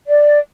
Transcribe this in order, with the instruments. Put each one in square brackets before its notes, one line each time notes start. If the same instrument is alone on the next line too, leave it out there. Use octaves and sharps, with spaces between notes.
[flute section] D5